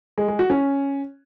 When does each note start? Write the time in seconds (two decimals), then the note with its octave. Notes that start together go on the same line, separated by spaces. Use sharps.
0.18 G#3
0.28 G#3
0.39 F#4
0.50 C#4